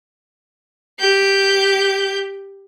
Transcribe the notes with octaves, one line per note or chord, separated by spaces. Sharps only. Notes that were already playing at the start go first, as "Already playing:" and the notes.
G4 G6